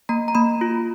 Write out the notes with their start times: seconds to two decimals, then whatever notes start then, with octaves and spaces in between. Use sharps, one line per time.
0.09 A#3 A#5
0.28 A#5
0.35 A#3 B5
0.61 F4